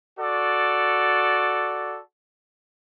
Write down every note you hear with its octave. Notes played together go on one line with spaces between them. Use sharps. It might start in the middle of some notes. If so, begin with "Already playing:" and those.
F#4 A4 D5